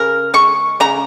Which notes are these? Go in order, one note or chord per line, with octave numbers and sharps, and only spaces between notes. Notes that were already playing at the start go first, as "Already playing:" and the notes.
Already playing: C#3 A#4
G#3 C#6
C#3 A#5